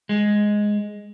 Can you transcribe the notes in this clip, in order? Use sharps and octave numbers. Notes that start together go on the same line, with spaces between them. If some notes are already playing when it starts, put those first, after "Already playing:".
G#3